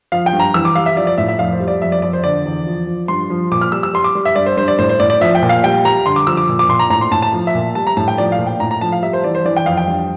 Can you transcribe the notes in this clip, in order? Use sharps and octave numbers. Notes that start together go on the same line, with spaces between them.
F3 F5
G5
G2
A#5
E3 E6
D6
G3 F5
E5
F3 D5
D5
A2 E5
E5
F2 F5
C5
G3
D5
F2 E5
D5
F2 D5
C5
D3 D5
E2
F3
F3
G2 C6
F3
A#2 D6
F6
G3 E6
E6
G3 C6
D6
G3
E5
G2 D5
C5
G2 C5
D5
A2 C5
C5
A2 D5
D5
F3 E5
G5
A#2
F5
G3 G5
G3 A#5
D3 C6
D6
F3 E6
D6
A#2
D6
A#2 C6
A#5
A2 A#5
C6
A2 A5
A5
F3
E5
A#2
G3 A5
A#5
A2 A5
G5
F3 D5
F5
A#2
G5
A2 A#5
A#5
F3 A5
F5
G3 E5
C5
E3 D5
C5
E3 D5
G5
F2 F5
G5
G2